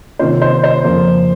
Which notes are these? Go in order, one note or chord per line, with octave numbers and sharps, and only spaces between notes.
C3 D#3 A#3 C#4 F4 C5
C5
C5
F2 C#3 F3 A#3